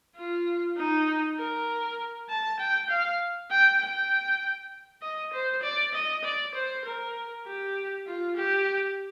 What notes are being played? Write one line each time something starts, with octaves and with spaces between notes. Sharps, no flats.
F4
D#4
A#4
A5
G5
F5
G5
G5
D#5
C5
D5
D#5
D5
C5
A#4
G4
F4
G4